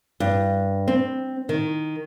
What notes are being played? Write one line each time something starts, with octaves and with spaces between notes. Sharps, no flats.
G2
C4
D#3